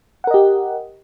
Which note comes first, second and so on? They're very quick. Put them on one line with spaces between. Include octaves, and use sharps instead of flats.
F#5 A#4 D#5 G4